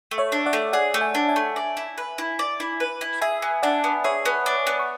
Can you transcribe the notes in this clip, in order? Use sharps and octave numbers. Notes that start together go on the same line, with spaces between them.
A3
C#5 E5
D4
D5 F#5
A3
G#4 D5 F#5
A3
E5 G#5
D4
E5 G#5
A3
D5
E4
B4
E4
D5
E4
B4
E4
G#4 E5 G#5
B3
D4 D5 F#5
B3
G#4 C#5 E5
B3
D4
B3
C#6